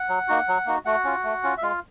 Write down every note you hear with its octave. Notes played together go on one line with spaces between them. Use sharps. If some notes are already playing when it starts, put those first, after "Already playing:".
Already playing: F#5
F#3
A#3 D#4 F#4
F#3
A#3 D#4 F#4
A3 F#4 F#5
C#4 F4
A3
C#4 F4
E5
G#3 F4 F5